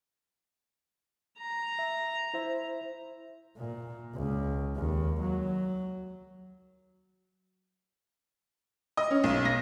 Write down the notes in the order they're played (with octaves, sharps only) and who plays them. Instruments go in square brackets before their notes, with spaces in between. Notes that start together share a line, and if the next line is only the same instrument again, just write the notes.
[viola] A#5
[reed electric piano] E5
E4 C5 E5
[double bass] A#2
C#2
D#2
F#3
[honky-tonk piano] D#5
C#4
B1
A#6